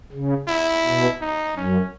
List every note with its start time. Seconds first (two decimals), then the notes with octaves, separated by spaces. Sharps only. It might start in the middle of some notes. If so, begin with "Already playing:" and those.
0.12 C#3
0.48 E4
0.84 B2
1.21 D#4
1.56 F#2 C#4